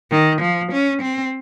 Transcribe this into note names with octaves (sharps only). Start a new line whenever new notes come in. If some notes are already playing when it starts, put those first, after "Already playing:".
D#3
F3
C#4
C4